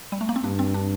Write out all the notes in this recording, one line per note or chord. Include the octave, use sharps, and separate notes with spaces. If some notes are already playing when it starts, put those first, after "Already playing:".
G3
A3
A#3
C4
G2 D4
C4
D4